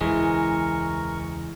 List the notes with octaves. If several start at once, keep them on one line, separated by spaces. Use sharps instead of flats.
E1 C#2 E3 G#3 A#4 C#6